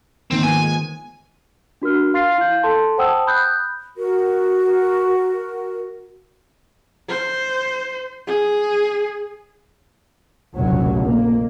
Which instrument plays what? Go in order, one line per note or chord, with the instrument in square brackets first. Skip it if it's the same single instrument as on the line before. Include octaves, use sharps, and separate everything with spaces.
[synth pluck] G#2 D#3 A#3 [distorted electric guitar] C4
[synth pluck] F3 B3 [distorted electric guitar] G#5
[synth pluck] G#3
[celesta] D4 F#4 A#4 F6
F5 C6 F6 A6 C7
E4 F5 G6
A4 A5 C6
C5 F#5 G5 A5 D#6 E6
B5 D#6 F#6 G6
[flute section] F#4 A#4
[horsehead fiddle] C5
G#4
[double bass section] F1 A#1 D#2 C#3 F#3
F2 A#3